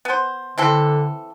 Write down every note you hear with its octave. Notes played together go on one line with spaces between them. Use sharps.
B3 C5
D3 E3 C4 A4